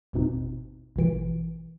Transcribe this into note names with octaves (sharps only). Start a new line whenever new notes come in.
G#1 E2 B2 C4 D#4
A1 B2 E3 D7